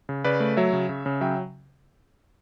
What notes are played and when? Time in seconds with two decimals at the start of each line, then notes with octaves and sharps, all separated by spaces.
0.09 C#3
0.24 C#3 B4 D5
0.40 A3
0.57 F#3 C#5 E5
0.73 C#3
0.89 C#3
1.06 C#3
1.21 F#3 E5 G5